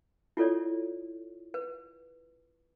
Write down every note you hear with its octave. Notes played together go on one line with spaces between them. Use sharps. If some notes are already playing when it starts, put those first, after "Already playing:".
E4 F4 A4 C#5 D5
B4